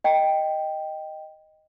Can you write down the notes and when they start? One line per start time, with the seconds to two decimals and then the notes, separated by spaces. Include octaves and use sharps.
0.04 D#5 G5